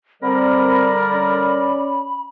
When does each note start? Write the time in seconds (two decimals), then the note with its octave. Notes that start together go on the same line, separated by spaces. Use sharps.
0.23 D3 G3 C4 A#4 D5 B5
1.13 C#4